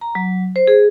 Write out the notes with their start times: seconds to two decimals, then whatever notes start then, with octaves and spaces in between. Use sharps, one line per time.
0.01 A#5
0.15 F#3
0.56 C5
0.67 G#4